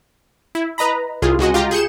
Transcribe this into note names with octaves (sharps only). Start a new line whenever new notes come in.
E4
B4 D#5 A#5 B5
C2 F4 G#4
C#2 G#3 F#4 D#5
F4 G4 A#5
G#4 G6 C#7 E7